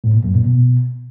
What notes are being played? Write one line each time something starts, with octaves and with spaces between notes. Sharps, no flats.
A2
A#2
F#2
A#2
B2